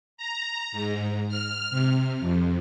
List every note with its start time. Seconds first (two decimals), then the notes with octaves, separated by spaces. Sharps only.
0.17 A#5
0.72 G#2
1.28 F6
1.70 C3
2.20 F2